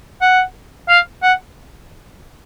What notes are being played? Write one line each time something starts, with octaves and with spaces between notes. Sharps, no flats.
F#5
F5
F#5